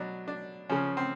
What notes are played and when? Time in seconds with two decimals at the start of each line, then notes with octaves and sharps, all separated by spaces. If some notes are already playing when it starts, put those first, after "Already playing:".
Already playing: B2 F#3 D4
0.28 D4
0.69 C#3 F3 C#4
0.97 C4